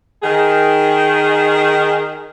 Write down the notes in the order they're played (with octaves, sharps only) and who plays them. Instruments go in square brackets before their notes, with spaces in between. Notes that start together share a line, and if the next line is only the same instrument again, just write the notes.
[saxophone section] D#3 G#4